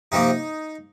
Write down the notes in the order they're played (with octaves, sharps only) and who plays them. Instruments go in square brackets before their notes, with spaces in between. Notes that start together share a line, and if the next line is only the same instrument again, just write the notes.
[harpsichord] C3 F3 A#3 D#4